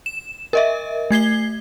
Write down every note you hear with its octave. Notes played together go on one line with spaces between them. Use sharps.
E7
A#4 D#5 E5
A3 G#6 C7 G7